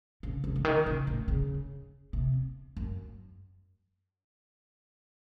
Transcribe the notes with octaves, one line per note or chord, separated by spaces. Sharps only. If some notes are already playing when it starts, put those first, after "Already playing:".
C#3
C#3
C#3
D#3
C#3
A2
C#3
C3
F#2